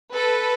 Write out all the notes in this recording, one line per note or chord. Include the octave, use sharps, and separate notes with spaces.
A4 B4